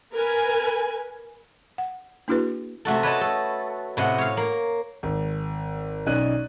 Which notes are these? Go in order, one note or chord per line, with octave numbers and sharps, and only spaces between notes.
A#4 B4 G#5
F#5
A#3 D4 E4 F#4 G#4 B4
C3 A3 F#4 A4
B4 C#5 D#5 A5
A4
A2 C3 D#5 F#5
C#5 F5
A#3
G#1
B1 C#4 D#4 D5 F#6 D#7